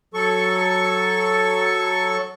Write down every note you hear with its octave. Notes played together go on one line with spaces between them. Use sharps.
F#3 A4 C#6